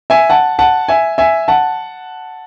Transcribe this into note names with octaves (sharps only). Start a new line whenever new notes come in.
E5 G#5
F#5 A5
F#5 A5
E5 G#5
E5 G#5
F#5 A5